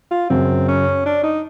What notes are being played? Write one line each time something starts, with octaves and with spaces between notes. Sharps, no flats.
F4
F#2 C#3 F#3 C4
C#4
D4
D#4